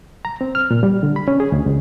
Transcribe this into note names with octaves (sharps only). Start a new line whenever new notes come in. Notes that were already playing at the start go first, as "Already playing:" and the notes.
A#5
C4
F6
A#2
G3
D3
B5
C#4
G#4
D2
C#2